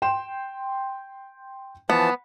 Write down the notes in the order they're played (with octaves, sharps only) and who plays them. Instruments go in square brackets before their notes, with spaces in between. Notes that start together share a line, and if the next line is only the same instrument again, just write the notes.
[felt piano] G5 C6 E7
[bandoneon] E3 F3 A5 [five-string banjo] B3